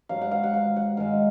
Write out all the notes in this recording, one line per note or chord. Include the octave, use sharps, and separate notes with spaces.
G#2 F#3 F5
F#5
F5
F#5
F5
F#5
G#2 D#3 G#3 F5